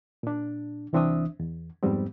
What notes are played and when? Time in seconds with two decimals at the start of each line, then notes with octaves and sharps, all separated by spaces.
0.23 A#2 D4
0.93 C2 E3 C4 D4 E5 D#6
1.40 E2
1.83 F2 G#2 G3 B3 C4